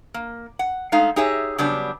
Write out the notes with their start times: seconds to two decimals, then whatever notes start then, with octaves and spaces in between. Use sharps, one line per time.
0.14 A#3
0.59 F#5
0.92 G#3 A3 D#4 F5
1.16 D#4 G4 G#4 C#5 E5
1.58 C#3 F#3 G3 B3 D4 G4